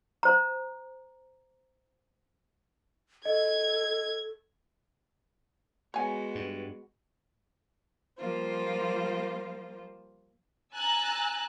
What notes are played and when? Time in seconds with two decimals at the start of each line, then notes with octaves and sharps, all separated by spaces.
0.23 C5 A#5
3.25 A4 D#5 G#6
5.94 G#3 B3 F#4 C#5 G#5
6.35 G2
8.18 F3 G3 A#3 F4 C5
10.75 G#5 A#5 E6 F#6 A6